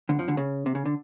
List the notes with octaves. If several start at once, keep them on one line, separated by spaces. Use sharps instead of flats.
D2 D3
F2 F3
D2 D3
C#3
C3
C#3
D3